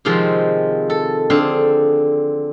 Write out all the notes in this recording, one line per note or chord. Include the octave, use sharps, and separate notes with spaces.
C3 D#3 F3 G#3 C4
A4
D3 C4 D4 G#4 F5